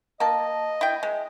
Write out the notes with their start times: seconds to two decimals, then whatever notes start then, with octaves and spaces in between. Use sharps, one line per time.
0.20 A#3 D#5 A5
0.81 E4 G5
1.03 G#3